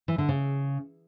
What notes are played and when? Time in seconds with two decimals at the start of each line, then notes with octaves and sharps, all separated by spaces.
0.08 E3
0.18 D3
0.29 C#3